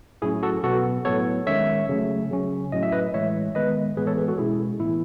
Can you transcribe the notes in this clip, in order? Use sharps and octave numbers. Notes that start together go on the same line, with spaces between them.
A2 F#3 C#4 E4 G#4
F#4 A4
B2 F#3 B3 F#4 A4
A2 F#3 B3 A4 C#5
D#3 G#3 C#4 C#5 E5
C#3 F#3 A3 C#4
C#3 F#3 C#4
A2 F#3 C#4 D#5
E5
B4 D#5
A2 E3 G#3 C#5 E5
D#3 G#3 B3 B4 D#5
A2 E3 G#3 B3 G#4 B4
A4 C#5
G#4 B4
F#4 A4
B2 G#3 C#4 E4 G#4
A2 E3 B3 E4